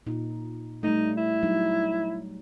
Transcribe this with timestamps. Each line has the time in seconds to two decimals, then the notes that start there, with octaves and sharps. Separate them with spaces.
0.06 A#2 D#4
0.83 G3 A3 D#4
1.17 E4
1.43 F#3 G3 D#4